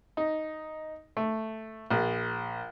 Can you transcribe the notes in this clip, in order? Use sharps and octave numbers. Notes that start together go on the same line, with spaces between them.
D#4
A3
A#1